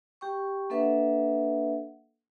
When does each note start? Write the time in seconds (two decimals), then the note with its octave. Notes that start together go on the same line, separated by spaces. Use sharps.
0.21 G4 G5 C#6
0.70 A#3 D4 A4 B4 E5 F#5